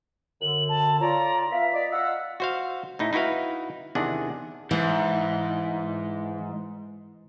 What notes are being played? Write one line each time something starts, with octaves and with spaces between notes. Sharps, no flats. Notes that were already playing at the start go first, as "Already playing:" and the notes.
F#2 D3 F#7
A5
F4 A4 C#5 D5 A#5
B3 E5 F5 B6
D5 D#5
F4 F5 F#5 E6
F#4 C5 F5
A2 D#4 E4
D#4 E4 F#4 B4 F5
E2 C3 D#3 D4 G#4 F#5
G#2 E3